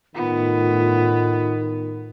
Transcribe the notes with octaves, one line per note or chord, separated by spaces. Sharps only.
A2 D#3 B3 F4